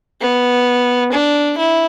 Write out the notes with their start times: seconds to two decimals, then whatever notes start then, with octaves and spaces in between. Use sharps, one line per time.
0.20 B3
1.12 D4
1.57 E4